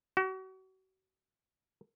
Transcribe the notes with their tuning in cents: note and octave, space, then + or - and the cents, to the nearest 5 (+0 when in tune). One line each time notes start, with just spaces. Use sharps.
F#4 +35